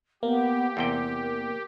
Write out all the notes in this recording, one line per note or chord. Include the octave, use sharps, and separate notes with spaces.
A#3 B3 G4
E2 C3 A#4 G5